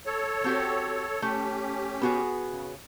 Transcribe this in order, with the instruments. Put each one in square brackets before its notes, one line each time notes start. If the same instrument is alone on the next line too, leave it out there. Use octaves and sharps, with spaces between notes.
[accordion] A4 C#5
[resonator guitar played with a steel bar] C4 F#4 G4
[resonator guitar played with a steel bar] A3 [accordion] C#4 G4
[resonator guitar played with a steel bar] B3 F#4 G#4
[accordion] C#3